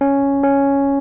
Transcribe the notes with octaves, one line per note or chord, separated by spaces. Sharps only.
C#4
C#4